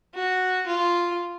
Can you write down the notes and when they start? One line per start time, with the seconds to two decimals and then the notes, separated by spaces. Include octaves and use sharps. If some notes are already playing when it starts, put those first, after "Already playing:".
0.15 F#4
0.67 F4